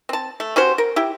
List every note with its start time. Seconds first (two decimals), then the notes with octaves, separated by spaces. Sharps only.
0.09 C4 A5
0.40 A3
0.56 C#4 F#4 G4 C5
0.78 A#4
0.96 E4 G4